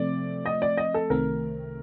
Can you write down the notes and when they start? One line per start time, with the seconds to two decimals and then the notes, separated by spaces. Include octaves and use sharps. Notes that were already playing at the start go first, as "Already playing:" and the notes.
Already playing: C3 F3 A3 C4 D5
0.46 D#5
0.62 D5
0.77 D#5
0.94 A4
1.10 C2 C3 D#3 A3 C4 A#4